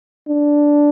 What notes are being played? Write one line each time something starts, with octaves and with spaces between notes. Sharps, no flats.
D4